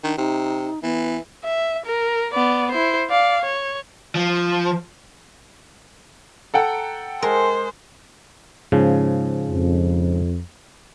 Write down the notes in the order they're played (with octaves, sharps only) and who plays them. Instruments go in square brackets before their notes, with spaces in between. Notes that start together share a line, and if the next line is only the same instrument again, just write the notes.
[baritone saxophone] D#3 [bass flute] D4
[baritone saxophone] C3 [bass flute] D#4
[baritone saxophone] E3 [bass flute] B3
[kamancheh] E5
A#4
B3 D5
E4 C5
D5 F5
C#5
[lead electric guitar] F3
[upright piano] A4 F#5 G5 [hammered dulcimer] A#5
[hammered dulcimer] G#3 [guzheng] A#4 [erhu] C5
[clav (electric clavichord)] G#2 C#3 F3
[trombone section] F2